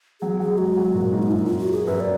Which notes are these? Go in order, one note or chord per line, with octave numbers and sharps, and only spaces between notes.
F#3 G#4
F#3 G#4
G#3 F#4
F#3
A#2
G#2
D#4
F#2 F4
D#4
F4
F#4
G#4
F#2 B4
D5